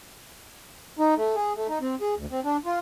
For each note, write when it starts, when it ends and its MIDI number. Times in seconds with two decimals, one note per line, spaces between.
0.99 1.14 63
1.17 1.35 57
1.36 1.53 68
1.56 1.67 57
1.69 1.79 63
1.81 1.95 60
2.01 2.14 68
2.17 2.26 38
2.31 2.40 60
2.44 2.57 62
2.65 2.79 65